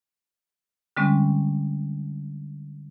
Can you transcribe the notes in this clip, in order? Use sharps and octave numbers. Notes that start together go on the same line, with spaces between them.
D3 G3 G#3 C4 C#4